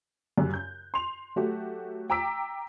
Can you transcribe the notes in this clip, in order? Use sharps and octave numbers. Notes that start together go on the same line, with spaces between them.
F#2 C#3 G4 F#6
G6
C6 F7
F#3 A3 F#4 G4
G5 A#5 D6 E6 B6 D7